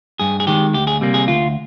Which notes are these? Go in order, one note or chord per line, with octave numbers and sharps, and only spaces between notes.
G2 G#4
G#4
D#3 G#3 G4
D2 G4
G#4
C3 G3 A#3
G#4
D2 F4